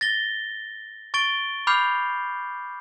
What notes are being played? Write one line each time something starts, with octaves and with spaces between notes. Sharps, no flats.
A6 A#6 G7
C#6 A6 D7 G7
B5 D6 F6 G6 C7 F7